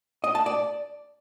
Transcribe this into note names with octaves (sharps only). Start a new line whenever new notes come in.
D#5
A5
D5